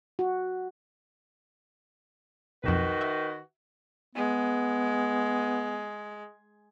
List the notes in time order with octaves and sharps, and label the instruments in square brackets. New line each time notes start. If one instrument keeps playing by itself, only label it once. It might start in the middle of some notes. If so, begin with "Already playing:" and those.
[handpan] F#4
[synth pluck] B1 F2 [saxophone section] D#3 F#4 B4
[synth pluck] E5
[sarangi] G#3 [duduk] B3